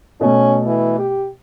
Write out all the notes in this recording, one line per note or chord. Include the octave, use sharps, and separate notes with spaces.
B2 A3 C#4
E3
G4